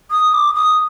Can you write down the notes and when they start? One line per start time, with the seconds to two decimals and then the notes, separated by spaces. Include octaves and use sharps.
0.11 D#6
0.34 D6
0.55 D#6